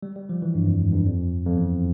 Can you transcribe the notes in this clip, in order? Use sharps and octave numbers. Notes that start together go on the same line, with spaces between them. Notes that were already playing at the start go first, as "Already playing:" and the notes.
G3
G3
F3
E3
G2
F2
G#2
G2
F2
F2
E2